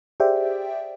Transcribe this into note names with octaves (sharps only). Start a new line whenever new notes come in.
G4 G#4 C5 D5 E5 G5